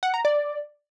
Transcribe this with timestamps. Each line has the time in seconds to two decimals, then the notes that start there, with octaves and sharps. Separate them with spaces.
0.03 F#5
0.14 A#5
0.25 D5